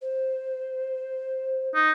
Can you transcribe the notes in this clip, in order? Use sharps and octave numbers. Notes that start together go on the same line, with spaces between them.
C5
D#4